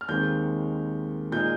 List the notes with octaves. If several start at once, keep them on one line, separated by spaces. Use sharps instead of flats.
F6
D#2 D#3 G#3 C4 G6
A#2 G#3 D#4 G6